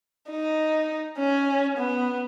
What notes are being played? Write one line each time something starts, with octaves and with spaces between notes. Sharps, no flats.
D#4
C#4
B3